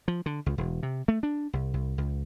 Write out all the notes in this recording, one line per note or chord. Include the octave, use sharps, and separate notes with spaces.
F3
D3
C#2
E1
C3
A3
D4
C2
C2
C#2